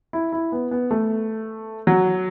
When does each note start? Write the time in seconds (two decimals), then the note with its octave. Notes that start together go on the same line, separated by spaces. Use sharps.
0.13 E4
0.32 E4
0.52 B3
0.71 B3
0.91 A3
1.87 F#3